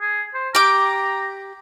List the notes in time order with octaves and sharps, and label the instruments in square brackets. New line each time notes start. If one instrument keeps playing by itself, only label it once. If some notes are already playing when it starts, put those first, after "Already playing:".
[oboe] G#4
C5
[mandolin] G4 D6 [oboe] A#5